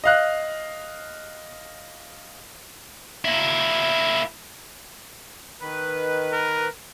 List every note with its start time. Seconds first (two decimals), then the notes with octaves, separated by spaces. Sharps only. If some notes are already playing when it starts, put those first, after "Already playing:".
0.04 D#5 F5 F#6
3.25 A#3 E4
5.61 D#3 B4
6.33 A#4